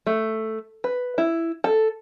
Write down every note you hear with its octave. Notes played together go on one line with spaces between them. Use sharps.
A3
B4
E4
A4